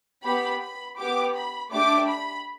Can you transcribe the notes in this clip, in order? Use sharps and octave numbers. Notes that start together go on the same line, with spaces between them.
B3 G4 B5
B5
B3 G4 D6
B5
A3 D4 G4 D6
B5